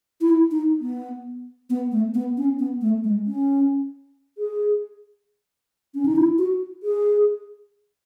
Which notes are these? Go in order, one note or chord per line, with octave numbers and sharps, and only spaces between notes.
E4
D#4
B3
B3
A3
B3
C#4
B3
A3
G#3
C#4
G#4
C#4
D#4
E4
F#4
G#4